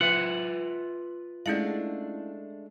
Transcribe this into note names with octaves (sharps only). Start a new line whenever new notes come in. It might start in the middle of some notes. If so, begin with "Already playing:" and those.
F4 B4 E5 F#5
G#3 A3 C#4 D4 E4 F5